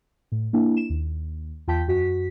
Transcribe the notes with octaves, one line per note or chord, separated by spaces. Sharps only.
A2
A#3 D4 E4
E7
D#2
E2 F4 G5 A5 G6 B6
F#2 F#4 B6